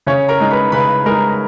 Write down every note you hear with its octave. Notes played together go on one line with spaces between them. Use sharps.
C#3 C#4 C#5
A#4 A#5
G#3 D#4
B4 B5
C#3 B4 B5
G#3 D#4 A#4 A#5